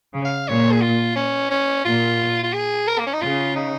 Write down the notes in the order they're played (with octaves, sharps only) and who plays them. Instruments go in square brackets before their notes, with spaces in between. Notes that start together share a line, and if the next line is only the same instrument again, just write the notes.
[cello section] C#3
[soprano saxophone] F5
[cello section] A#2 [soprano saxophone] C#5
[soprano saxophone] G#4
F4
C#4
C#4
[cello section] A#2 [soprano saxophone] F4
[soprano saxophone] F4
G#4
A#4
A#3
C#4
D#4
[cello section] C#3 [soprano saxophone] F4
[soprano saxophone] D#4